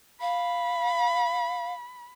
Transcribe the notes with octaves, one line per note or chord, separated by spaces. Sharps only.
F5 B5